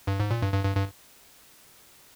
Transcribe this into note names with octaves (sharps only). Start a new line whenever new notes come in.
G2
G#2
A#2
G2
G2
G2
G2